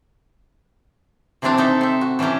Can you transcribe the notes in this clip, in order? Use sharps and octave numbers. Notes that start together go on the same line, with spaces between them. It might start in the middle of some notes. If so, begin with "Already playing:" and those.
C3 E3 A3 C4 D4 A#5
C4 D#4 A4 E5
C4 E5
F#4
E3 F#3 C#4 D4 G4 A#5